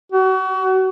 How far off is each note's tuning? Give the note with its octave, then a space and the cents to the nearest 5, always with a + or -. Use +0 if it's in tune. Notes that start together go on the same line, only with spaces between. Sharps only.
F#4 +35